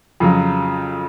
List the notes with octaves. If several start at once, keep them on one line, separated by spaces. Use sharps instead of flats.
F2 C#3 F#3